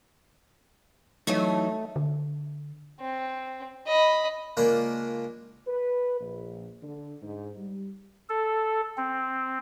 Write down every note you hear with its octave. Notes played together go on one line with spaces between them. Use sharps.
E3 F#3 A3 D#4
D3
C4
D#5 B5
C#2 A#3 D4 F4 A#4 B5
B4
A#1
D3
G#2
G3
A4
C4